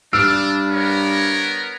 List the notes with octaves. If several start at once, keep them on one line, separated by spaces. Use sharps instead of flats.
G2 D4 E6 F6 D7
B3 A#4 C#5